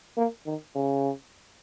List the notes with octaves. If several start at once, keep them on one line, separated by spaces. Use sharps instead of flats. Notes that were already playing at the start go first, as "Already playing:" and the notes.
A#3
D#3
C#3